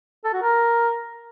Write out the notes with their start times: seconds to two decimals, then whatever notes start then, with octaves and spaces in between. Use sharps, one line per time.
0.25 A4
0.33 F#4
0.42 A#4